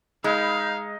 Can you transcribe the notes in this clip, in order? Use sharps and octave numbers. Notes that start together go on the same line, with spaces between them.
G#3 D#4 F5 B5 G6